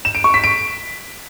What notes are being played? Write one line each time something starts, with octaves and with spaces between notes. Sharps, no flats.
E7
D7
C#6
B6
D7